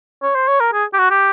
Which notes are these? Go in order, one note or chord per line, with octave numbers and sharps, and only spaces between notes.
C#5
C5
C#5
A#4
G#4
G4
F#4
G4